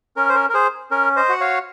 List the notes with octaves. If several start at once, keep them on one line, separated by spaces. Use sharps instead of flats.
C#4 A#4
C5
A#4
A#4
G#4 C5
C#4 A#4
C5 D#5
F#4 F#5
C#5 F5